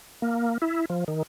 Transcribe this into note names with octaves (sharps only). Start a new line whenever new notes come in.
A#3
E4
F3
D#3